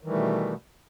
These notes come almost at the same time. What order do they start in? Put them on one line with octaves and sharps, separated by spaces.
D#3 E3 G3 A3 B2